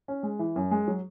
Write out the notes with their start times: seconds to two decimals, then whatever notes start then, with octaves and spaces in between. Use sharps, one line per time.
0.08 C#4
0.23 G#3
0.39 E3
0.56 F#2
0.71 G#3
0.88 F#3